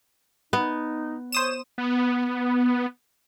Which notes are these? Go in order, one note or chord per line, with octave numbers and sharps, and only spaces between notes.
B3 D#4
C5 C#5 D#6 E7
B3